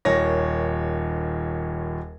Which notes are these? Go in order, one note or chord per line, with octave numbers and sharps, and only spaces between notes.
D#1 D#2 C#5 A#6